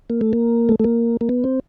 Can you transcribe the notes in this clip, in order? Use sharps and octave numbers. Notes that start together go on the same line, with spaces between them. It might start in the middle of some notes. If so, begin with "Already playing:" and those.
A#3
A3
A#3
A3
A3
A#3
A#3
B3
C4